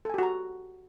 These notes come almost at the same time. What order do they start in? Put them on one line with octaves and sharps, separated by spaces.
A4 G#5 G4 F#4 A#5